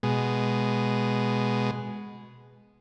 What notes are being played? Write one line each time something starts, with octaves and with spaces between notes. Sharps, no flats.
B2 G#3